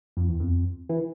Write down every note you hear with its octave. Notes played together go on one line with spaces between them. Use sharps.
F2
E2
F2
E3